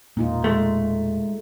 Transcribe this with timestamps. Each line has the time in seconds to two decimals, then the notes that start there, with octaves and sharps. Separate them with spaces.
0.17 E1 A#2 A#3 D#4 F4
0.44 G#3 A3